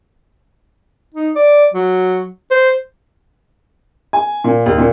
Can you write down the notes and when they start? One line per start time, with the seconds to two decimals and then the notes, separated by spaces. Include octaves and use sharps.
1.14 D#4
1.36 D5
1.74 F#3
2.51 C5
4.13 G#5
4.44 A#2
4.66 D#2
4.78 A#2